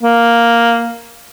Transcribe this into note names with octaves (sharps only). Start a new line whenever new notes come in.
A#3